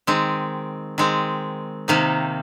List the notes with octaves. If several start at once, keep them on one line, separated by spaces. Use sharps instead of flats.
D#3 G#3 C4
D#3 G#3 C4
C3 D#3 A#3 D#4